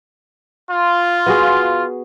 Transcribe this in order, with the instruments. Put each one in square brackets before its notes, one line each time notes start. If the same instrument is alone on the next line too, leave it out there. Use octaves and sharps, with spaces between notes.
[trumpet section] F4
[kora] B3 F#4 G#4